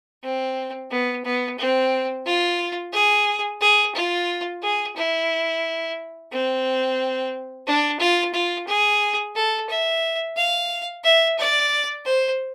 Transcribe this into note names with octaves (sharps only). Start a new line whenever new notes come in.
C4
B3
B3
C4
F4
G#4
G#4
F4
G#4
E4
C4
D4
F4
F4
G#4
A4
E5
F5
E5
D5
C5